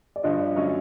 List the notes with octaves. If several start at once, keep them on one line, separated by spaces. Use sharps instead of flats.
D5
G2 D3 F3 D#5
D5
D3 F#3 A3 C#4 D#5